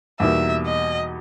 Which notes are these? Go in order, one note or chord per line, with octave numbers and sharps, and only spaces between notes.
E2 B2 G3 A#3 D#4 E5
D#5